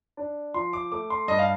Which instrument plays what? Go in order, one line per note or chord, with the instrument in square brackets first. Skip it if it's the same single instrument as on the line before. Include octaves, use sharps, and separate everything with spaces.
[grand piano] D4
F3 C6
D6
A3 D6
C6
G2 D#5
F5